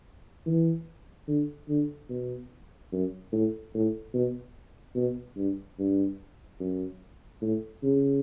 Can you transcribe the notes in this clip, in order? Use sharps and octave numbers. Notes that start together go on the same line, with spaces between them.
E3
D3
D3
B2
F#2
A2
A2
B2
B2
G2
G2
F#2
A2
C#3